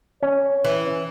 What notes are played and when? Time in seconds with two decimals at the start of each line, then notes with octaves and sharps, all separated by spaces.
0.23 C#4 C#5
0.64 E3